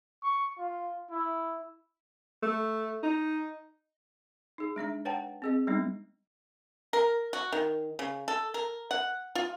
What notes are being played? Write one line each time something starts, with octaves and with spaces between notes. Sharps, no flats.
C#6
F4
E4
A3
D#4
D#4 G#4
G#3 D4 E5 A#5
B4 C#5 F#5 G5 A5 A#5
C4 G#4 D#5
G3 G#3 B3 D4 D#4
A#4
F#4
D#3
C#3
A4
A#4
F#5
F4